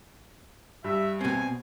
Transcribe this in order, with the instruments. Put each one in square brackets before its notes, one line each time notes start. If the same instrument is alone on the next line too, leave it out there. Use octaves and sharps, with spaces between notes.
[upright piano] G2 [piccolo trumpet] E5
[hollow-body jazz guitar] B2 C4 [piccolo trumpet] G#5